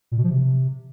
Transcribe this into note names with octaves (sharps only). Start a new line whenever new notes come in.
A#2
B2
F3
C3